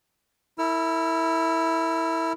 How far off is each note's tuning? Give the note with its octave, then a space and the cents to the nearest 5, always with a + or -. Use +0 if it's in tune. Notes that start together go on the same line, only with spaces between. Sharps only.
E4 -10 A#4 -45 E6 +45